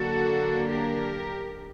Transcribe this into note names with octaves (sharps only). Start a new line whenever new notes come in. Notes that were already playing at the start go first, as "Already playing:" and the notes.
Already playing: D3 F#3 A#3 D4 F#4 A4
G4 A#4